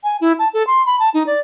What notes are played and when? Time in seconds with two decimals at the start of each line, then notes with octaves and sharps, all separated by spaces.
0.04 G#5
0.21 E4
0.39 A5
0.54 A4
0.67 C6
0.86 B5
1.00 A5
1.14 D#4
1.27 D5